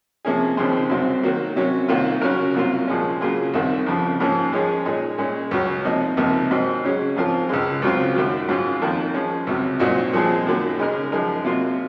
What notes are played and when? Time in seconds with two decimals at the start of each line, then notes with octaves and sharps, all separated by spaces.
0.25 C3 F3 A#3 C#4 G#4
0.57 D#2 C#3 F3 G#3 C4
0.89 C2 C3 F#3 C4
1.23 D#3 F#3 A#3
1.56 C3 F#3 C#4
1.88 C2 C3 D#3 A#3 F4
2.22 C#3 F#3 C#4 F#4 A#4
2.54 C2 C3 F#3 A#3 F4
2.87 A#2 F3 G#3 C#4
3.21 C#3 F#3 A#3 F4 G#4
3.54 C2 C3 D#3
3.86 F2 C#3 F3
4.20 G#2 F3 A#3 C#4
4.52 F3 G#3 C#4 G#4 C#5
4.85 A#2 G#3 D#4 G#4
5.18 A#2 G#3 C#4
5.51 C#2 C#3 F#3 C#4
5.85 C3 F3 A#3 D#4
6.17 C#2 C3 F3 A#3 D#4
6.51 G#2 F#3 C4 D#4
6.83 C#3 F#3 C#4 G#4
7.16 G#2 F3 C4 F4 A#4
7.49 C#2 C#3 G#3
7.82 C#2 C#3 F#3 C4 F4
8.15 F#2 D#3 F#3
8.49 G#2 F#3 C#4 F4
8.81 F2 D#3 A#3 F4
9.14 F3 G#3 C#4
9.47 C#2 C3 F#3
9.80 C2 A#2 F#3 C4 D#4
10.13 A#2 F3 G#3 C4
10.46 F#2 D#3 F#3 A#3
10.79 C#3 G#3 D#4 A#4
11.12 F#2 F3 G#3 D#4 A#4
11.45 C3 F#3 A#3 F4